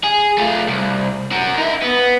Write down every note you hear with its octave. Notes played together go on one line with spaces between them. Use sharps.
G#4
A3 F4
C2
F#4 A#4
D#4 E5
B3